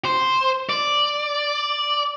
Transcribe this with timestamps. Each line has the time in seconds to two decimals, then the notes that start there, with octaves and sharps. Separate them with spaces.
0.05 C5
0.69 D5